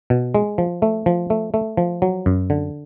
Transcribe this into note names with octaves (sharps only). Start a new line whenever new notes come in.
B2
G#3
F3
A3
F3
A3
A3
F3
F#3
F#2
D3